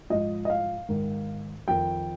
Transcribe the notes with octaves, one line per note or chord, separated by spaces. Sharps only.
G#2 F3 D#5
D#5
F5
G#2 D#3
F2 D#3 G5